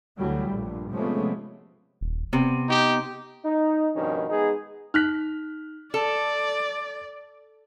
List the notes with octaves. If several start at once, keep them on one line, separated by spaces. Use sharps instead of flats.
D2 E3 F#3 G3 A3
A#1 G2 A#2
C3 F3 G#3 A3 B3 C#4
D#1
C3 B3
D#4 G4
D#4
G2 B2 D#3 F3 C#4
G#3 B3 D#4 G#4
D#4 F6 F#6 B6
A4 D5 A5